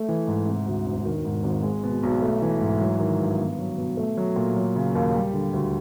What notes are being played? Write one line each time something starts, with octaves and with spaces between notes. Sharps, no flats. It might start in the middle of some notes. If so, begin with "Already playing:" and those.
Already playing: A3
E3
G#2
C3
D2
E1
D#3
G#2
G#1
G#3
B2
B1
A3
E3
G#2
F#3
D#3
G2
B3
F#3
B2
A3
F#3
A#2
F#3
C#3
D#2
G3
D3
D2